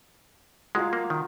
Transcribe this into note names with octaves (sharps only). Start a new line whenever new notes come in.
F#3 G#3 F4 F5
A#3
D#3